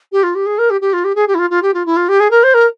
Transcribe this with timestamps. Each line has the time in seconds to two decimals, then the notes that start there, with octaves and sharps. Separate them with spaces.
0.12 G4
0.23 F4
0.35 G4
0.46 G#4
0.58 A#4
0.70 G4
0.81 G4
0.93 F4
1.04 G4
1.15 G#4
1.28 G4
1.34 E4
1.39 F4
1.50 F4
1.62 G4
1.74 F4
1.86 E4
1.96 F4
2.08 G4
2.20 G#4
2.31 A#4
2.43 C5
2.54 A#4